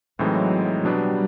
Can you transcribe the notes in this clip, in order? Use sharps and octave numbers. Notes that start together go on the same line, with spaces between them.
A2 E3 F#3 G#3 C4 D#4
B2 F#3 G3 B3 D4